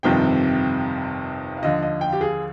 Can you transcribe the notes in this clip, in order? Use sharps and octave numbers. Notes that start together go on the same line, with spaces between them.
G1 F2 C3 D#3 G5
F5
D#2 D3 F3 D#5
D#5
G5
G4
G#4